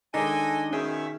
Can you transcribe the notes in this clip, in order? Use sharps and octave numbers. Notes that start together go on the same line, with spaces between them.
D#3 G#3 D4 A4 C#5 D#5 G#5
B2 D#3 C#4 G#4 E5 G5